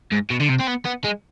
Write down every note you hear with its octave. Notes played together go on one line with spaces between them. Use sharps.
G#2
B2
D3
C3
C4
B3
B3
G#3